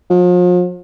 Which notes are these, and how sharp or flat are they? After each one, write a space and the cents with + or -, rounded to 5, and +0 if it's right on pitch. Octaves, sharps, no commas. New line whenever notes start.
F3 +40